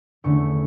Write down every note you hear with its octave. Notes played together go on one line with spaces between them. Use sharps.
E2 D3 A3 C#4 C#6